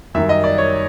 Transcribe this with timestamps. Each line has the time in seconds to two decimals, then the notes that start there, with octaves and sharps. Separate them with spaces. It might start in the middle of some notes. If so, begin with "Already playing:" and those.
0.14 F#2 D#3 G3 E5
0.29 D#5
0.44 D5
0.58 C#5